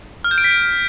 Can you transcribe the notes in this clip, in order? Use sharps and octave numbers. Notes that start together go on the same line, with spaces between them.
F6
G6
D7
B6
D7